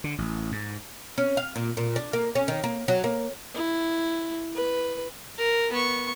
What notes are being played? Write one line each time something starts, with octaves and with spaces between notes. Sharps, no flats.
D3
A1
G#2
C#4
F5
A#2
A#2
D4
A#3
C#4
D#3
A#3
F#3
A#3
E4
B4
A#4
B3 C#6